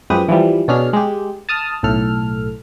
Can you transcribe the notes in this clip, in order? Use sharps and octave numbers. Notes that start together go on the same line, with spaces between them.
F#2 F3 G#3 G4 B4 D#6
E3 F3 G3
B2 C#4 D4 G#4 F6
G#3 G4
A5 D#6 F6
B1 A2 A4 F6